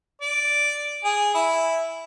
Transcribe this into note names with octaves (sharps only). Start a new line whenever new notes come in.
D5
G#4
E4